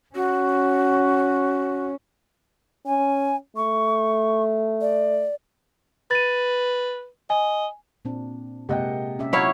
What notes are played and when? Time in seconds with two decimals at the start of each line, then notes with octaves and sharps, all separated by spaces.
0.15 C#4 F#4
2.86 C#4 G#5
3.56 A3 C#6
4.81 D5
6.11 B4 A6 D#7
7.30 D#5 G#5
8.05 A#2 C4 D4
8.69 C3 G#3 A#3 D#5 F#5 G5
9.19 C#4 G4 E5
9.33 F#3 E4 C#5 F5